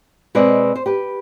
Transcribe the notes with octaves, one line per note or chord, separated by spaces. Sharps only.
B2 G#3 C4 B4 D5
C5
G4 B4